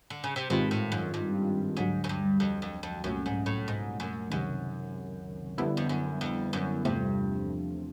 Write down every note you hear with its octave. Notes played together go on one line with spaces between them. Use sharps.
D3
C#3
C3
G#2 B2 D#3 G#3 C4 F4
A2
F#2
G2
D2 G#2 D3 F#3
F#2
G2
F2
F2
F2
C2 F#2 A#2 F#3 A3 C#4
G#2
A2
G#2
F#2
C#2 F#2 C3 D#3
F2 D3 G3 B3 E4
F2
F#2
F2
F#2
E2 G2 C3 F3 A3